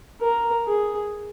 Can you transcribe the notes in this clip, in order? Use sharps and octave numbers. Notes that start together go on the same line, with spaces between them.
A#4
G#4